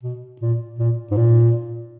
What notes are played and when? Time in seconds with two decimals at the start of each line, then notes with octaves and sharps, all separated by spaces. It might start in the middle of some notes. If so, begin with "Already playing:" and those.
0.03 B2
0.41 A#2
0.79 A#2
1.11 G#2
1.17 A#2